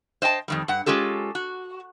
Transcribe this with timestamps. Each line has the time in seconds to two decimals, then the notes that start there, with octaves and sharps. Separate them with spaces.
0.22 C5 D#5 G5 A5
0.48 F2 D#3 G3
0.68 G2 F#5
0.86 G#3 C#4 F4 G4 A4
1.35 F#4